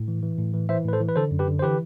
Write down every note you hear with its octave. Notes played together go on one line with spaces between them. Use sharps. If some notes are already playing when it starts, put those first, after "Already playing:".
Already playing: A2
E3
E3
A2
E3
E3 C5 E5
A2 B4
A4 C5
E3
B4
D3 A4 C5
F#2
G4 B4
D3
C5
E3 G4 B4